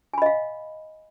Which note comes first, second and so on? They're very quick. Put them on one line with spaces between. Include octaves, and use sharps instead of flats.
G#5 B5 D#5 F5